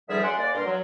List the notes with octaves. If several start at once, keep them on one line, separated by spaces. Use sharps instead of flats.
E2 D3 F3 G3 G#4 E5
F#2 G#4 D5 F#5 C6
D#2 G#3 A#3 D5
G2 A#4 C6
F#3